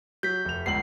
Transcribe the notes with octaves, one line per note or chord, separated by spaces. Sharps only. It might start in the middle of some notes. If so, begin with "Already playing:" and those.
F#3 G6 B6
F1 F7
G1 C#2 C7 F#7